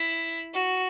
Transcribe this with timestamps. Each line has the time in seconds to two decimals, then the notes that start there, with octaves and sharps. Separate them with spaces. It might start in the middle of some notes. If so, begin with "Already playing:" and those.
Already playing: E4
0.53 F#4